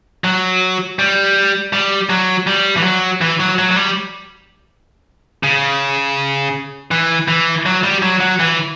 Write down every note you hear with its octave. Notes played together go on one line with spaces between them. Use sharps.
F#3
G3
G3
F#3
G3
E3
F#3
E3
F#3
F#3
F#3
G3
C#3
E3
E3
F#3
G3
F#3
F#3
E3